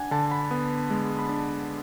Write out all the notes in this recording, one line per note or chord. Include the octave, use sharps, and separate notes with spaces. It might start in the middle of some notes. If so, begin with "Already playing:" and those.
Already playing: D4 F#5 G#5
D3 A5
B5
B3
G#3
B5
D4 A5